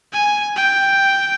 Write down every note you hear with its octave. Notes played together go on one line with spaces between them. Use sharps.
G#5
G5